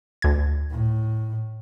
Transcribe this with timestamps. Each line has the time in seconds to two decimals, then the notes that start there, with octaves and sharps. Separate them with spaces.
0.22 D2 G#6
0.71 A2